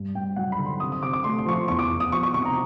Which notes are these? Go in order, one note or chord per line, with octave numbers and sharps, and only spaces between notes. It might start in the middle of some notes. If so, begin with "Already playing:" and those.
Already playing: G2
G2 G5
F#3 F#5
B5
D3
C6
C3 D#6
D#6
C3 D6
D6
A3 C6
C6
F3 C#6
C6
E2 C#6
D6
E2
D#6
F3 C#6
C#6
C3 C#6
A#5